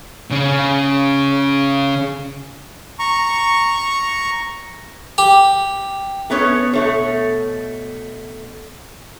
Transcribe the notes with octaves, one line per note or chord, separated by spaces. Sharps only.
C#3 C#4
A#5 C#6
G4
A3 B3 C#4 C#5
B2 A3 C#5